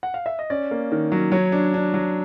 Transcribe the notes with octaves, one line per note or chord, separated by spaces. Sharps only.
F#5
F5
E5
D#5
C#4 D5
A#3
D#3
F#3
F#3 C#5
D4
D4
F#3